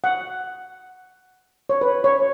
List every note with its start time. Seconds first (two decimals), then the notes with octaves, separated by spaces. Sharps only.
0.04 F#5
1.69 C#5
1.81 B4
2.04 C#5